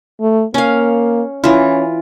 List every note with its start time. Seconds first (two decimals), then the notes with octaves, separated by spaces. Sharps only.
0.21 A3
0.54 A#3 C#4 F5
1.44 E3 C#4 F4